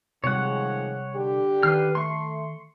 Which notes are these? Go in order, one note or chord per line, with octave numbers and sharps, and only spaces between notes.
C3 D#3 F3 G3 G#3 C#5 F#5
D3 G4
D#3 B4 F6 C7
A3 C6 C#6